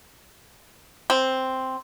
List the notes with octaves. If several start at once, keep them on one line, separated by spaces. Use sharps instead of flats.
C4